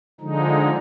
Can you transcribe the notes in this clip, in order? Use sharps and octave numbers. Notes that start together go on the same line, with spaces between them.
D3 F3 G#3 D#4